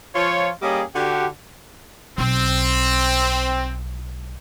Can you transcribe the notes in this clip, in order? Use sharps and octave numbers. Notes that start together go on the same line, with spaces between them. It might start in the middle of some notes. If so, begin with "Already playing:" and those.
F3 F4 C#5
G3 A#3 C#4 G4 G#4 D#5
D3 F#4 G4
B1 C4